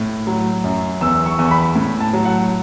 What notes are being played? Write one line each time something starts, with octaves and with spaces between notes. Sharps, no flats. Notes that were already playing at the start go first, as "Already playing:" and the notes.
Already playing: A2
F#3
F#2
E2 E6
C#6
E2
B5
A2
A5
F#3
F#5